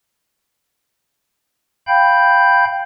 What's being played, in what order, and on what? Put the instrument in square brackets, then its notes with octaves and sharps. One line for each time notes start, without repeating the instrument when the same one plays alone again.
[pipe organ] F5 G5 B5 G6